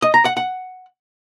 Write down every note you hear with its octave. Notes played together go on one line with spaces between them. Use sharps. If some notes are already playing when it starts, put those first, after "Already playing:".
D#5
A#5
F#5
F#5